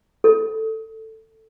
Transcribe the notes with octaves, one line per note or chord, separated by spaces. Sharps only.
A4